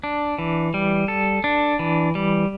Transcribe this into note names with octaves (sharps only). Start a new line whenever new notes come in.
D4
E3
G3
A4
D4
E3
G3